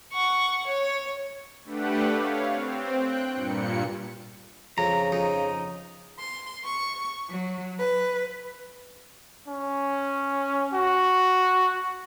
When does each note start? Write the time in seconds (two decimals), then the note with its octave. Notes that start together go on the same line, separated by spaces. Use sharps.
0.12 F#5 C#6
0.66 C#5
1.64 A3 D4 G4 B4 F#5
2.15 C#5 F5
2.50 C4
2.96 G5 F#6
3.32 G2 A#2 C#7
4.78 F2 C#3 A#5
5.12 F2 D#4
6.19 C6
6.64 C#6
7.28 F#3
7.80 B4
9.48 C#4
10.74 F#4